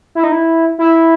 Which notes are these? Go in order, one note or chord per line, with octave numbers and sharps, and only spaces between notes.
E4
D#4
E4
E4